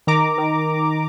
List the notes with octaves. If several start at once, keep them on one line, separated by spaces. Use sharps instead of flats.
D#3 A#5 D6
D#3